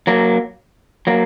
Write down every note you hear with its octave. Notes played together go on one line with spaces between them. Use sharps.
F#3 A#3
F#3 A#3